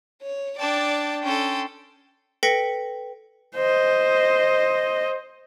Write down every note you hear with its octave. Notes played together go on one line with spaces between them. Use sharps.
C#5
D4 D5 G5 A5
C#4 A4 G5 C6
A4 B4 G5 A#6 B6 C#7
C5 D#5